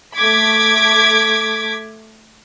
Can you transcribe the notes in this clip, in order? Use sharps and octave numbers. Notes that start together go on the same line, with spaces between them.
A3 D6 G#6 B6